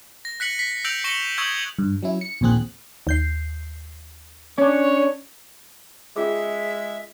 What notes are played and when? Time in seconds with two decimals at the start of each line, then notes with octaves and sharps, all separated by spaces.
0.25 A#6
0.40 F#6 B6 C#7 F#7
0.59 B6 C7
0.85 E6 G6 A#6 D7 F7 F#7
1.04 C#6 A#6 C#7 E7 G7
1.38 C#6 D#6 E6 G6 G#6 F#7
1.79 G2
2.03 F#3 C#4 E4
2.21 C#7
2.41 A#1 D#2 A#2 C4 G#4 F#6
3.07 D#2 G6 C7
4.58 C#4 D4 C#5
6.16 G#3 C#4 F4 G#4 E5